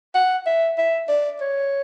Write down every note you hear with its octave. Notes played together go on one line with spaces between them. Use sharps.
F#5
E5
E5
D5
C#5